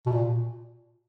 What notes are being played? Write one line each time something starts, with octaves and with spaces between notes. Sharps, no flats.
B2
A#2